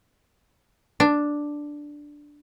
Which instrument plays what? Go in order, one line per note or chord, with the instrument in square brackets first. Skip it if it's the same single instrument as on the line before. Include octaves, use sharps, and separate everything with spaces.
[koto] D4